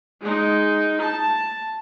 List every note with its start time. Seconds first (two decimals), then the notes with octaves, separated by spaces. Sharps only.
0.21 G#3 D#4
1.02 A5